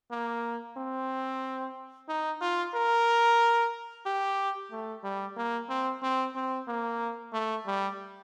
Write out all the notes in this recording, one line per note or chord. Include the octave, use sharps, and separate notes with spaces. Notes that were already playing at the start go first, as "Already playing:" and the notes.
A#3
C4
D#4
F4
A#4
G4
A3
G3
A#3
C4
C4
C4
A#3
A3
G3